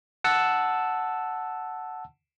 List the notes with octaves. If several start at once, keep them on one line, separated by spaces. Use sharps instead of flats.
F#5 A5 E6